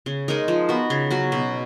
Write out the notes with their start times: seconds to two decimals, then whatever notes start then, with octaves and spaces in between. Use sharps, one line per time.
0.06 C#3
0.28 G#3 D#4 A#4
0.48 F3
0.69 B3 F#4
0.90 C#3
1.10 F#3 C#4 F#4
1.32 B2